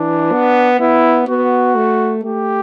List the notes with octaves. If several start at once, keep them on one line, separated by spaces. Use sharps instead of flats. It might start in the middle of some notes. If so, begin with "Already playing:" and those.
Already playing: E3 D4
B3
B3 E4
B3 F#4
A3
A3 G4